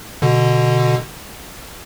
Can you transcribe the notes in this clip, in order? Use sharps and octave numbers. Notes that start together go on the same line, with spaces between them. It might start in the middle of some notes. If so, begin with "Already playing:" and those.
B2 D3